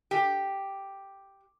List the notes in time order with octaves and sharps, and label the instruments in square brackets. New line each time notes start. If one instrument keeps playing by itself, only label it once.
[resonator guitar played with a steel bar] G4